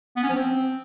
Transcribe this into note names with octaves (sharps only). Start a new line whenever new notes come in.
B3
C#4
F3
C4